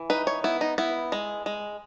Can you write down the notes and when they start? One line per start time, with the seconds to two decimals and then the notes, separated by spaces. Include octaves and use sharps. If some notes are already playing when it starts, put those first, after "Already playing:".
Already playing: E3
0.10 D#4 B4
0.27 C#5
0.44 B3 E4
0.61 D#4
0.78 B3 E4
1.12 G#3
1.46 G#3